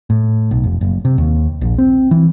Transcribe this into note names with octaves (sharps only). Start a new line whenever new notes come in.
A2
B1
F1
F#1
C3
D#2
A#1
C4
E3